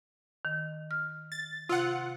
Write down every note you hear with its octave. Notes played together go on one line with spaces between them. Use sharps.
D#3
F6
A6
C3 F4 F#5